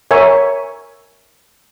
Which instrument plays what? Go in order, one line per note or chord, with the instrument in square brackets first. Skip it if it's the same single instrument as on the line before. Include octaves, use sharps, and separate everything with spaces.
[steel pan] A#4 C#5 E5 G#5 C#6